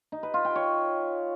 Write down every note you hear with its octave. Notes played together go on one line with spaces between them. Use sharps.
D#4
B4
F4
G5
C#5